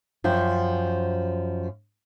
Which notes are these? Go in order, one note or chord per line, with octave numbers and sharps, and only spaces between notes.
F#2 F3 C5 G5